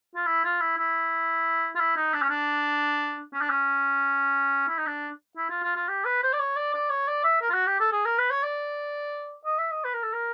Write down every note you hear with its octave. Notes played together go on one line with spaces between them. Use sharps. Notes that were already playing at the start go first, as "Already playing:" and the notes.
F4
E4
F4
E4
E4
F4
E4
D#4
D4
C#4
D4
C#4
D4
C#4
E4
D#4
D4
E4
F4
F4
F4
G4
B4
C5
D5
C#5
D5
D5
C#5
D5
E5
A#4
F4
F#4
G4
A4
G#4
A#4
B4
C#5
D5
D#5
E5
D#5
B4
A#4
A4
A#4